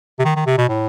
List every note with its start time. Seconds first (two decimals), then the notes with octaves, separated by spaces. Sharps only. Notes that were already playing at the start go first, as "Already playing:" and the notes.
0.19 C3
0.25 D#3
0.36 D#3
0.46 C3
0.58 B2
0.69 A2